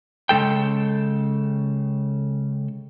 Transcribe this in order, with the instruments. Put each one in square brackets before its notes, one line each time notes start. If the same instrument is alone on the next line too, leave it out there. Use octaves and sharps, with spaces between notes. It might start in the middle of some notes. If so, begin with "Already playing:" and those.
[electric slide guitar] C#3 G#3 A4 G5